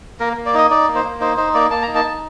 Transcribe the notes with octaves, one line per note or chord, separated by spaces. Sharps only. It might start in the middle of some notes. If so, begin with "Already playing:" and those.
A#3 A#4
A#3
D5
D#4 D#5
D#4 D5
A#3
C5
A#3
D#4 C5
D#4 C5
A#3 D5
A#3 A5
D#4 A#5
A5
D#4